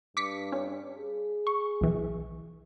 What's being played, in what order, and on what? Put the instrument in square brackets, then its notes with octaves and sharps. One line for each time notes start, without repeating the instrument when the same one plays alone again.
[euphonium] G2 [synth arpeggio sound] D6 B6 C#7
[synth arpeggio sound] C#4
[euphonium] G#4
[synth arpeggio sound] C#6
B1 E3